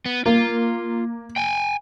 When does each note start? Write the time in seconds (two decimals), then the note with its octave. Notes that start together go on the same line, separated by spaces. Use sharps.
0.06 B3
0.26 A#3 F4
1.36 G5 G#5